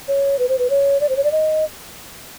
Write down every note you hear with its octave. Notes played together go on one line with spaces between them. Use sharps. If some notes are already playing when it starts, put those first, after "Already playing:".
C#5
B4
C5
B4
C#5
D5
C5
C#5
D5
D#5